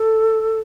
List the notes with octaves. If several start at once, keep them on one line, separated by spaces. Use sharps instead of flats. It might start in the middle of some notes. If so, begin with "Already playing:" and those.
Already playing: A4